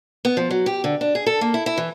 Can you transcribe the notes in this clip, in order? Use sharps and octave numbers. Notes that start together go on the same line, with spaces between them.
B3
F3
F#3
G4
D3
D4
G#4
A4
A#3
E4
E4
E3